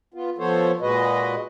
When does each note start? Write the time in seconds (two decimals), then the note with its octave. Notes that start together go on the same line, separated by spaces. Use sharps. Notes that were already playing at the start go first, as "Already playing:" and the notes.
0.14 B3 F4
0.38 F3 B3 A4 C5 C#5
0.81 A#2 G#3 F#4 B4 D#5